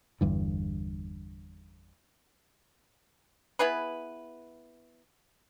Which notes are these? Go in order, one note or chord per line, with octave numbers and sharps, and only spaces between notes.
G1 E2 G2 D3
B3 E4 G#4 B4